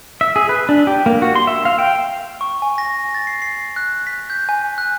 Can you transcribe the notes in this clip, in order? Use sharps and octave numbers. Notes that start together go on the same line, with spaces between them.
E5
G#4
B4
D4
G4
A#3
F#4
C6
E5
F5
G5
C#6
G#5
A#6
A6
C7
C7
F#6
B6
G6
G#5
F#6